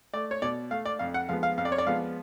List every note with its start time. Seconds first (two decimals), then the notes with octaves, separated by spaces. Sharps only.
0.13 A3 D5
0.31 C#5
0.42 B2 D5
0.70 A3 F5
0.85 D5
0.99 F2 F5
1.14 F#5
1.29 F3 G#3 B3 F5
1.43 F5
1.58 F2 F5
1.65 D5
1.72 C#5
1.78 D5
1.87 F3 G#3 B3 F5